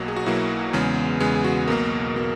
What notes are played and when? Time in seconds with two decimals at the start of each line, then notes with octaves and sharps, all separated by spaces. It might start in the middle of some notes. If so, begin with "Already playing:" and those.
Already playing: B1 B2 F#3 A#3
0.08 G#4
0.16 F#4
0.26 B1 B2 F#3 A#3 E4
0.73 E2 C#3 G#3 B3
1.20 E2 C#3 G#3 B3 G#4
1.35 G#4
1.44 F#4
1.68 B1 B2 A#3 A#4
2.16 B2 A#3